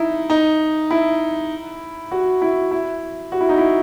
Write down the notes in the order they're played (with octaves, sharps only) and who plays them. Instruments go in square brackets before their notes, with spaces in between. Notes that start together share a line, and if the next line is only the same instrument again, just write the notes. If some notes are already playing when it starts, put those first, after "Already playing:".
Already playing: [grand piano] D#4 E4
D#4
E4
F#4
E4
E4
F#4
E4
D#4
E4